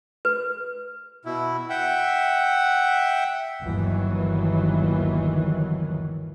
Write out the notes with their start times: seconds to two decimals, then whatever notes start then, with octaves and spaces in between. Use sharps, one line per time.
0.25 B4
1.25 B2 E4
1.70 E5 F#5 G5
3.61 G1 D#2 D#3 E3 F#3